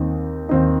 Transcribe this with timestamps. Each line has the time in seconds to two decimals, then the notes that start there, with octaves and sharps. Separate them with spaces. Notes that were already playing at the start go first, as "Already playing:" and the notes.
Already playing: D#2 D#3 C4 D#4
0.49 D#2 D#3 C4 D#4